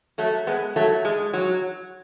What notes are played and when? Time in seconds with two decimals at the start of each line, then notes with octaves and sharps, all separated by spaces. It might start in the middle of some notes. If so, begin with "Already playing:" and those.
0.18 F#3 A3
0.47 G#3 B3
0.76 F#3 A3
1.05 G#3
1.34 F#3